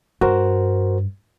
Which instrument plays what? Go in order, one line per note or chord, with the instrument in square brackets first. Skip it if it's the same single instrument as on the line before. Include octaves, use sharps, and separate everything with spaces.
[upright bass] G2 [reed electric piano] F#4 A#4 C5